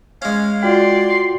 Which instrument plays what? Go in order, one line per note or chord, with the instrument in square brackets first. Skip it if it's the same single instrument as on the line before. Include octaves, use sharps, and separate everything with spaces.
[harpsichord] G#3 C#4 [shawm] F5
[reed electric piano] F4 F#4 G5 [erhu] D5 [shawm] C6